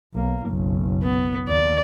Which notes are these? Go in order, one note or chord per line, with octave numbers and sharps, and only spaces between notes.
B1 A#3
F#1 B1
B3
D#2 D5